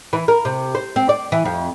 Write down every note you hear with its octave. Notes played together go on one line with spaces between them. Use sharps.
E3
A#4
C3
C5
C4
D5
E3
F2